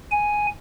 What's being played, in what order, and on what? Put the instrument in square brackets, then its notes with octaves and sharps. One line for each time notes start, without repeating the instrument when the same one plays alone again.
[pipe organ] G#5